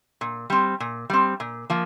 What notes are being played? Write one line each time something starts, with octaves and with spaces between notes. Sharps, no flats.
A#2
G3 C4
A#2
G3 C4
A#2
F3 A#3